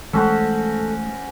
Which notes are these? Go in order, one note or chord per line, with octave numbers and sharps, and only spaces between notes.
E3 G#3 A3 C#4 F#4 A4 C5